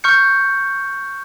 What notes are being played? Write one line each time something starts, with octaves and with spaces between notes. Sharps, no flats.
C#6 F6 G6 C#7